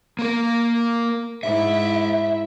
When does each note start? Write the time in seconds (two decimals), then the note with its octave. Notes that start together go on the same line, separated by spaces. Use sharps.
0.19 A#3 A#4
1.43 G#2 E4 E5